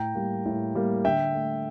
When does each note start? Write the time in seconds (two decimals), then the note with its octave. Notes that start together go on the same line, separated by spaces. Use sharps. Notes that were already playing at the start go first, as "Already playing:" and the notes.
Already playing: A2 G5 A#5
0.15 G3 A#3
0.46 A2
0.75 G3 A#3
1.04 D3 E5 G5
1.34 A3